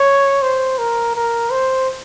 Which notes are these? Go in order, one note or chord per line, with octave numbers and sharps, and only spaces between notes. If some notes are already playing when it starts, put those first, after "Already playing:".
Already playing: C#5
C5
A#4
A#4
C5